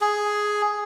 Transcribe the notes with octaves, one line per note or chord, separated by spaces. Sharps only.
G#4